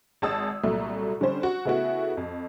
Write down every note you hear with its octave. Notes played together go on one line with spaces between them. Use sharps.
G#1 G#3 A5 D#6 E6
C2 A#2 F#3 A3
D3 G3 C#4 C5
F#4
C#3 A3 B3 E4 F#4
F2